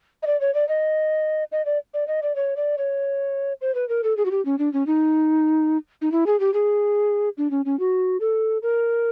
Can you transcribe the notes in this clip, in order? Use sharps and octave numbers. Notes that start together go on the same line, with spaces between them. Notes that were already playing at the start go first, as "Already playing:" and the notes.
D#5
D5
C#5
D5
D#5
D#5
D5
D5
D#5
D5
C#5
D5
C#5
C5
B4
A#4
A4
G#4
F#4
G4
C#4
D4
C#4
D#4
D#4
E4
G#4
G4
G#4
D4
C#4
C#4
F#4
A4
A#4